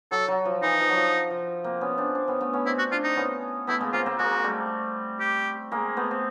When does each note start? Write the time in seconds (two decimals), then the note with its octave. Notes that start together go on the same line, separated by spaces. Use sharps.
0.11 F#3 A4
0.28 F#3
0.45 F3
0.62 E3 D#4
0.80 F3
0.89 F#3
0.96 F3
1.30 F3
1.64 A#3 C4
1.81 B3 C#4
1.98 C4 D4
2.15 C4 D4
2.28 B3 C#4
2.40 A3 B3
2.53 B3 C#4
2.66 C4 D4 E4
2.79 F#4
2.92 C4 D4 F4
3.04 D#4
3.17 B3 C#4
3.67 A3 B3 E4
3.81 G#3 A#3
3.93 A#3 C4 F4
4.06 A#3 C4
4.18 G#3 A#3 F#4
4.44 G3 A3
5.20 G4
5.72 G#3 A#3
5.97 A3 B3
6.11 C4